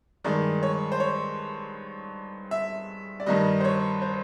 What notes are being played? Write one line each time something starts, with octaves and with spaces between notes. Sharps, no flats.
G2 D#3 G#3 D5
C#5
C5
C#5
E5
D5
G2 D#3 G3 D#5
C5
C#5
C5